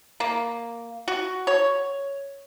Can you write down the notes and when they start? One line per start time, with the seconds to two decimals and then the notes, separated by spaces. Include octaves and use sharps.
0.20 A#3
1.08 F#4
1.47 C#5